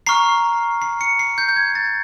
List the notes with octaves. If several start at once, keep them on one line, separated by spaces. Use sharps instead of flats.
A#5 C#6 F6 C7
C7
C#7
C7
G6
G6
G#6
A6